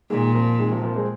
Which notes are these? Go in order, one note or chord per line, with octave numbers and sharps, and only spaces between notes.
A#2 D#3 G#3
F3 A#3
D#3 G#3
C3 F3
F3 A#3
G#3 C4